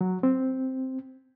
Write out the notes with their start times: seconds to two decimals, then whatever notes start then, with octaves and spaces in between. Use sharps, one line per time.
0.01 F#3
0.23 C4